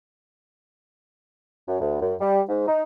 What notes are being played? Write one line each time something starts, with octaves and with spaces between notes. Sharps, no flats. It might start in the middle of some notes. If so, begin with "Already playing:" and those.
F#2
D2
F#2
G3
G#2
D#4